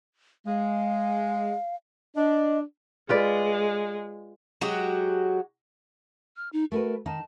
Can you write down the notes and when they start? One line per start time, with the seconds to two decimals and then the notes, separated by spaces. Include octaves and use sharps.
0.47 G#3 F5
2.16 D4 D#5
3.09 G#3 F4 B4 D5
4.61 F#3 G#3 F#4 G4
6.37 F6
6.53 D#4
6.72 A3 F#4 A#4 B4
7.06 D#3 D#4 A5